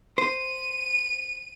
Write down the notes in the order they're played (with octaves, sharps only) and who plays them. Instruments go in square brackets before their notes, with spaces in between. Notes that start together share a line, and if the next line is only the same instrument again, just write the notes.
[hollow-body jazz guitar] C5 [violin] D#7